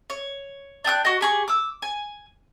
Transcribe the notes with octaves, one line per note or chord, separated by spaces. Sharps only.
C#5
D4 G5 D#6 F#6
F#4 D#5
G4 G#4 C#6
D6 E6
G#5